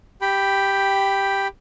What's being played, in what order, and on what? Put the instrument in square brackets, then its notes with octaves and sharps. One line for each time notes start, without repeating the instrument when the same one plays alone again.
[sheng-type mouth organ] G4 G5 B5